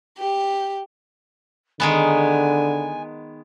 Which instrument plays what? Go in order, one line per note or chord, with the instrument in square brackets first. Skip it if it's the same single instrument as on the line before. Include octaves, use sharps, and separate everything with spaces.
[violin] G4
[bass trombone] D3 [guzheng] D#3 G#3 B3 [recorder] G#5